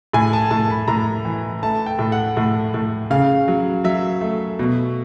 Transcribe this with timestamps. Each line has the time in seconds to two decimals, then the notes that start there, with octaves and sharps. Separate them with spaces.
0.13 A2 G#5
0.33 A5
0.51 A2 A5
0.70 B5
0.88 A2 A#5
1.25 E3
1.63 A3 A5
1.86 G5
1.99 A2
2.12 F#5
2.37 A2
2.74 A2
3.10 C#3 F5
3.48 F#3
3.84 F#3 E5
4.21 A3
4.59 B2